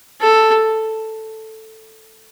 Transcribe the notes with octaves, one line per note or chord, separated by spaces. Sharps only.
A4